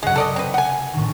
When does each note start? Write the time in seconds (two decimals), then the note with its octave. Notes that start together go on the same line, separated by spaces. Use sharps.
0.03 C#2 F#2 G#3 F#5
0.16 C3 A4 D5 D#5
0.36 C4 B4
0.54 F#5 G#5
0.93 A#1 A2 D#3